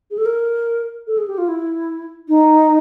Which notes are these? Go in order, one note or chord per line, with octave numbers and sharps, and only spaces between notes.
G#4
A4
A#4
A4
G#4
G4
F4
E4
D#4